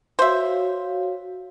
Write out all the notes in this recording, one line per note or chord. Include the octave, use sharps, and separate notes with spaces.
F#4 C5 C#5 E5 F5